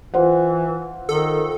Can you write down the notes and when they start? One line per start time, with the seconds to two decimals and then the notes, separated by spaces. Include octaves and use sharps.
0.14 E3 F4 C5 F#5
1.09 D#3 A4